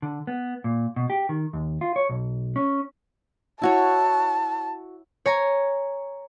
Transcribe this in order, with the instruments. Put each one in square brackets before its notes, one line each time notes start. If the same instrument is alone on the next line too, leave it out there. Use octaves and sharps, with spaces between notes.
[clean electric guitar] D3
B3
A#2
B2
G4
D#3
D#2
F4
C#5
B1
C#4
[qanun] E4 F#4 C#5 [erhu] A5
[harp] C#5 G#5 A#5